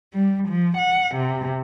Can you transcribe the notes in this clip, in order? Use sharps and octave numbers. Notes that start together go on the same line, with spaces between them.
G3
F3
F#5
C3